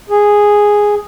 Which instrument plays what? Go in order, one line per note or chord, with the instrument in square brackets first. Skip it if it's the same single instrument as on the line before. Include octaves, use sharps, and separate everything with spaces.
[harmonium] G#4